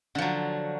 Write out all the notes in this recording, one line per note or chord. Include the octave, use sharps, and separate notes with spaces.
D3 F3 F#3